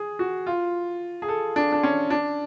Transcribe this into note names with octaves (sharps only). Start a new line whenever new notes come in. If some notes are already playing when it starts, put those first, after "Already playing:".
Already playing: G#4
F#4
F4
G#4
A4
D4
D4
C#4
D4